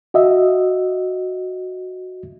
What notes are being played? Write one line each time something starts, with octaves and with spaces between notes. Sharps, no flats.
F#4 D#5 E5